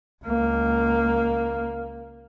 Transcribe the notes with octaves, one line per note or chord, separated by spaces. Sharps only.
C#2 A#3